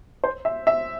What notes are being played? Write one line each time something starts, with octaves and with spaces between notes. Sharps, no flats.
C5
E5
E5